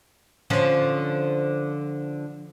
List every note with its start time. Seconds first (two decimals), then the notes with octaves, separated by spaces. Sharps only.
0.50 D3 F3 C#4